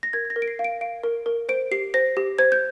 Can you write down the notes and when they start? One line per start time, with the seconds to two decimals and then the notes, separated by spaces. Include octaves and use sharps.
0.03 A#6
0.13 A#4 G#6
0.25 G#6
0.30 A#6
0.36 A#4
0.42 D7
0.48 C7
0.59 F5
0.64 D7
0.81 F5 D7
1.04 A#4
1.26 A#4
1.49 C5 D7
1.71 G4 C7
1.94 C5 A#6
2.17 G4
2.38 C5 G#6
2.52 G6